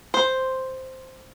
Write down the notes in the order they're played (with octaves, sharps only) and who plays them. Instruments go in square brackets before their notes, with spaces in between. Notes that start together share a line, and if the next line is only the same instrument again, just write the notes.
[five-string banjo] C5